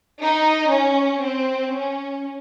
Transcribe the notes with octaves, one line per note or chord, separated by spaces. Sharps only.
D#4
C#4
C4
C#4